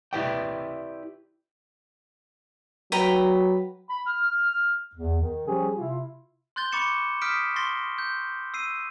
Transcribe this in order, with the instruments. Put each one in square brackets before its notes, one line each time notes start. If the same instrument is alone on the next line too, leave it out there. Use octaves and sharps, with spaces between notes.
[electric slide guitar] E4 F4 G4 B4 D5 G5
[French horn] F#3 [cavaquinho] B4 G5 A#5
[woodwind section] B5
F6
E2
D#3
F3 G3 C#4 G4 G#4
C3 E4 F4
[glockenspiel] C6 F#6 G6 A6 G7
B5 C#6 D6 A6 C#7 E7
D#6 F6 G6 B6 D7 E7
C6 C#6 A6 A#6 C7 G7
G6
E6 C7 D#7